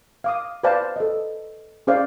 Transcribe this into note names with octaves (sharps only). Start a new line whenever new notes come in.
F5 D6 D#6
B4 C5 D5 F5 G5 A5
A4 D#5
C#4 G#4 C5 D5 F5 C6